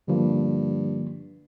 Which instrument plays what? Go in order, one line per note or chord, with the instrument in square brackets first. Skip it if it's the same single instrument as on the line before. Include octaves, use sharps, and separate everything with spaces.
[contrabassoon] G2 [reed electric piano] D3 F3 A#3